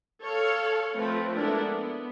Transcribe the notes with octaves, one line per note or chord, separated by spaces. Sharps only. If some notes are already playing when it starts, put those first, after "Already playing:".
A4 C#5 F5
F3 A3 C4 B4
G#3 B3 D4 E4 A4 A#4
B3